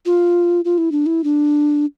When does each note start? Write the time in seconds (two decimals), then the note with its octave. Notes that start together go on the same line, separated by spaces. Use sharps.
0.06 F4
0.65 F4
0.78 E4
0.92 D4
1.06 E4
1.24 D4